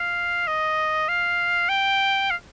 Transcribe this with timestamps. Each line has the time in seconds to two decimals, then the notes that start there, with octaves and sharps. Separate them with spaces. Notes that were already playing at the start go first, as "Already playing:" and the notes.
Already playing: F5
0.47 D#5
1.08 F5
1.69 G5
2.30 F5